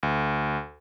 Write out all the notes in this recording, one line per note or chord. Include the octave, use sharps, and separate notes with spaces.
D2